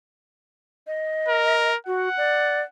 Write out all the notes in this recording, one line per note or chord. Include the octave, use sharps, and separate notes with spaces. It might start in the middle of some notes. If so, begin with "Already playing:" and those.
D#5
A#4
F#4 F#5
D5